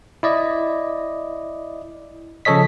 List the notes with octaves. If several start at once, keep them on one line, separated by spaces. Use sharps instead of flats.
E4 D5 D#5
C#3 F3 A4 C#5 D#5 B6